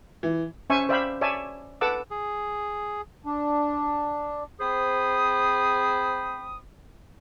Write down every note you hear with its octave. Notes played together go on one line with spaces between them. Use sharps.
E3
C#4 C5 E5 G#5 C#6
C5 D5 E5 F5 G5 B5
C#5 D5 E5 G#5 A5
A4 B4 F#5 A5 D6 E6
G#4
D4
C4 G#4 C5 B5 D#6